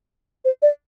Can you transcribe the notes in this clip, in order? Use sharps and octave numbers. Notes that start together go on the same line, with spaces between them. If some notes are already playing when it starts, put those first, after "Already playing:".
C5
D5